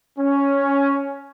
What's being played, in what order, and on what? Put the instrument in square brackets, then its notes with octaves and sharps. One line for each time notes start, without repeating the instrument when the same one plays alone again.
[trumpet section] C#4